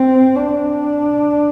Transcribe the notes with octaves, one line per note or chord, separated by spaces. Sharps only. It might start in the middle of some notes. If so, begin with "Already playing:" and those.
Already playing: C4
D4